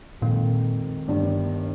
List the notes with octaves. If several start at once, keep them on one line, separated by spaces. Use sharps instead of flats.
F2 A#2 D#3 G#3
G1 G2 D#3 G3